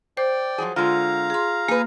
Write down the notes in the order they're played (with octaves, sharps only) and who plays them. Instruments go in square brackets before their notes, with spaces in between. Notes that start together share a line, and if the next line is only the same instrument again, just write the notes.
[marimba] C5 [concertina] D5 G5
[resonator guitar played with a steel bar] F3 F#3 G#4
[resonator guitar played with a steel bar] D3 G#3 [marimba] F4 [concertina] F5 A#5
[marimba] G#4 C6
[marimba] A#3 [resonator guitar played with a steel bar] G#4 B4